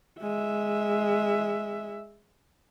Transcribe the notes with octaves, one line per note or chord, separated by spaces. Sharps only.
G#3 E5